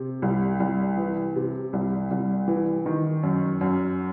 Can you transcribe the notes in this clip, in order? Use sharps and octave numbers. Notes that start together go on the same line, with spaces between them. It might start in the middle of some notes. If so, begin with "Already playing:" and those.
Already playing: C3
C2
C2
E3
C3
C2
C2
E3
D#3
F#2
F#2